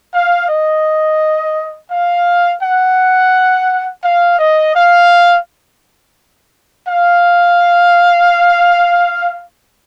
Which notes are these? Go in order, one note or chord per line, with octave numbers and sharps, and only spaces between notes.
F5
D#5
F5
F#5
F5
D#5
F5
F5